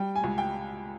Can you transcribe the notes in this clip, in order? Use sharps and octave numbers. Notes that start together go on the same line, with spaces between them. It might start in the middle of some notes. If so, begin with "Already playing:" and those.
Already playing: G3 G5
G#5
C#2
G5